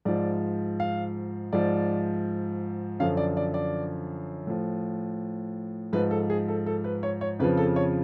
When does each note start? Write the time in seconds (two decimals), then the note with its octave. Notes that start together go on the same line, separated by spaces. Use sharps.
0.05 G#2 F3 D5
0.80 F5
1.53 G#2 F3 D5
3.00 F#2 D3 F3 F5
3.17 D5
3.37 D5
3.54 D5
4.47 A2 F3
5.93 G#2 F3 B4
6.11 A4
6.30 G#4
6.48 A4
6.66 A4
6.84 B4
7.03 C#5
7.21 C#5
7.39 F2 C#3 F3 B4
7.57 A4
7.76 C#5